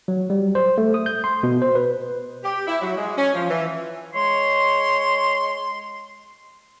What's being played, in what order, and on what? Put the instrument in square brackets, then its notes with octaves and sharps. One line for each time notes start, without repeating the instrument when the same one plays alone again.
[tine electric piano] F#3
G3
C5
A3
D#6
G6
C6
B2
C5
B4
[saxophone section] G4
E4
F#3
G#3
C#4
F3
E3
[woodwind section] G#3 C#5 C6